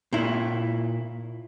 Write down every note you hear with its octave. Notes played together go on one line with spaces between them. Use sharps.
A#2 E4